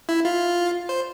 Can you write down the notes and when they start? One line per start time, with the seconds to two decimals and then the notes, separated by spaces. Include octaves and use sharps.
0.09 E4
0.25 F4
0.89 C5